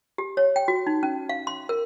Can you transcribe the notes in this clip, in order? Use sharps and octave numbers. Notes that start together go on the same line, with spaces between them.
G4
C#5
G5
F#4
D#4
C#4
F5
C6
A#4